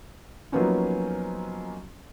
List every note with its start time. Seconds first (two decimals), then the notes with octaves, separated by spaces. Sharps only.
0.52 F3 F#3 A#3 B3 C#4 D#4